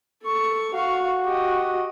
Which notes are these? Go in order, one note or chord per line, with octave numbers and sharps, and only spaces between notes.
A4 C#6
F#4 F5 C#6
G4 D#5